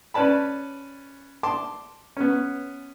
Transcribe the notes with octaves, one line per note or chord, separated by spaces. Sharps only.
C#4 B4 D5 A5 B5
A5 C6 D6
B3 C#4